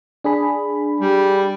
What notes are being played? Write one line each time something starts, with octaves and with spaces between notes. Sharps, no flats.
D4 G#4 B5
G3